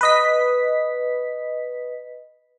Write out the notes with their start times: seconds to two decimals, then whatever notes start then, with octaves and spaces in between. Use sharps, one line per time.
0.01 B4 D#5 B6